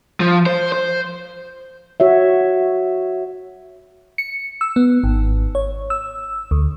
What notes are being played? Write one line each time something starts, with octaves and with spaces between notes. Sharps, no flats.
F3
C5
C5
F#4 C#5 E5
C#7
E6
B3
G#1
C#5
E6
D2